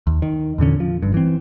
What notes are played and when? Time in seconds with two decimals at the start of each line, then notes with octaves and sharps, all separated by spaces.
0.07 D#2
0.22 D#3
0.58 E2 A#2 D3 C#4
0.80 F3
1.03 G1 G2
1.14 E3 C4